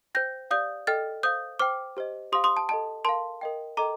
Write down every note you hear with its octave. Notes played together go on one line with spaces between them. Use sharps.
C5 G5 G6 A#6
G4 D5 F5 D#6 G6
A4 D#5 G5 F6 A6
C5 F5 D#6 G6
C5 G5 D6 F6
G4 C5 D#5
G4 C5 F5 C6 D#6
C6 D#6
A5
A4 D#5 G5 A5
A#4 F5 A5 C6
A#4 D#5 G5
A4 D#5 G5 A#5 D6